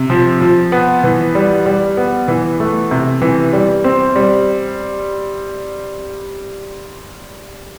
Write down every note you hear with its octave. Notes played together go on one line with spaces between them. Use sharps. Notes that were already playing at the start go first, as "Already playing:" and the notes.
Already playing: C3
F3
F3
B3
E3
G3
G3
B3
E3
A3
C3
E3
G3
C4
G3